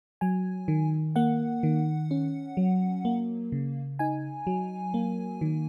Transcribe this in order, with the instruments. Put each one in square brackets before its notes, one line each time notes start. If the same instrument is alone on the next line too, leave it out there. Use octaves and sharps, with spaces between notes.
[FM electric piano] F#3 G#5
D#3
A#3 F#5
D#3
C#4
F#3
A#3
C#3
D#4 G#5
F#3
A#3
D#3